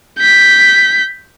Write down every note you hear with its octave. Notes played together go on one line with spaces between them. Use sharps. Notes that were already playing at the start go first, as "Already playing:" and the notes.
G6 B6